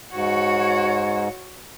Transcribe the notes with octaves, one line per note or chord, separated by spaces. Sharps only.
G#2 F#4 C#5